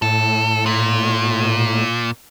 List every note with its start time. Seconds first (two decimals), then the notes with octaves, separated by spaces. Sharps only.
0.02 A2 A4
0.66 A#2